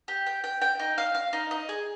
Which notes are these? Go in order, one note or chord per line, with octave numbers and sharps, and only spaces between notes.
G4
G5
G5
G5
D#4
F5
F5
D#4
D#5
G#4